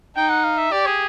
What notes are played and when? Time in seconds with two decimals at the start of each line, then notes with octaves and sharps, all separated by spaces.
0.16 D#4 G5
0.30 F#5
0.44 F5
0.58 E5
0.72 G4 D5
0.86 G#4